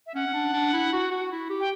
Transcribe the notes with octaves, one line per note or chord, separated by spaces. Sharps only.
E5
C#4 F#5
C#4
D4
D4
E4
F#4
F#4
E4
G4
G5